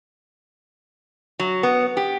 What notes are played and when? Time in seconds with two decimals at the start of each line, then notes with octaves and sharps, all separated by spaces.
1.39 F#3
1.63 B3
1.97 G4